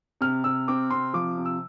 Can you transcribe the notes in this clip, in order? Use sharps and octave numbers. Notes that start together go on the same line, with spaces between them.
C3 F6
C3 E6
C4 D6
C3 C6
F3 D6
C3
E6